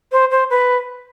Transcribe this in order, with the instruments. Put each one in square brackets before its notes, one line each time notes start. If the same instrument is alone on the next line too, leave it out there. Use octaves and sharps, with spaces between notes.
[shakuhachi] C5
C5
B4